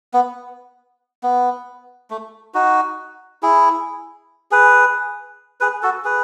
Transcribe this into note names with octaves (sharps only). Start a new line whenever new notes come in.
B3
B3
A3
D#4 F#4
E4 G#4
G#4 B4
G#4 B4
F#4 A4
G#4 B4